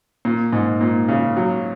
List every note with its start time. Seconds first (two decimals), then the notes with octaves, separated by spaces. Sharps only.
0.25 A#2
0.52 G#2
0.81 A#2
1.08 C#3
1.37 F#3